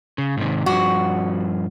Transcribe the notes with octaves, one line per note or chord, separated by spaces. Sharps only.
C#3
G#2 C3 D#3
G2 F3 F#4